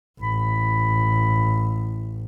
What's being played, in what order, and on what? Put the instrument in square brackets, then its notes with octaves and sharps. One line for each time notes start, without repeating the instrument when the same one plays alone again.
[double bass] A1 [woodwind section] B5